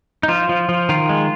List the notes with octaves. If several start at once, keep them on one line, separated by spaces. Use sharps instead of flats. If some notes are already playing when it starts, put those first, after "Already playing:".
D#4
F3 F4
F3
F3
D#3 F4
G#3